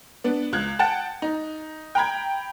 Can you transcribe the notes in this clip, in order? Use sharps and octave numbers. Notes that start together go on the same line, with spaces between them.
B3 D4
C#2 F#6 G#6
F#5 G5 A5 A6
D#4
G5 A#5 B5 G#6